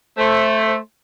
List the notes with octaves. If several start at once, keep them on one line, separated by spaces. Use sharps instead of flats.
A3 C5